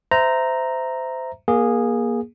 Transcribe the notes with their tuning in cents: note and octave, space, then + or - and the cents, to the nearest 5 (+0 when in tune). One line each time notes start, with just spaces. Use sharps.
C5 -20 E5 +0 A#5 +0
A#3 +20 G#4 -10